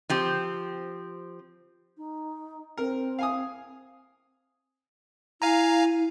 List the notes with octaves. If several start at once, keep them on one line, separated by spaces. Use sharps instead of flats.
F3 C4 G4
D#4
C4 A#4
F5 G#5 D#6
E4 F5 G#5 A#5